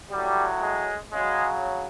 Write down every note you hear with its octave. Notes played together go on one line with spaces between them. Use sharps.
A2 F#3 G3
G#3
C#3 F#3 G#3